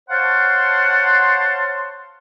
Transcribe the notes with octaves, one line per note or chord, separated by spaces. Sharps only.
C5 C#5 F5 F#5 A5 C6